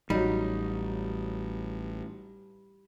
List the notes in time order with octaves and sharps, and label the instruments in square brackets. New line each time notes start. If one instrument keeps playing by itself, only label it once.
[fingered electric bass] A1 [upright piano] F#3 D#4 [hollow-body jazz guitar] G3